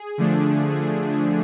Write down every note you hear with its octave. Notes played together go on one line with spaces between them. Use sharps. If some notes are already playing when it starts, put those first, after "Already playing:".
Already playing: G#4
D3 F3 A3 D4
G#4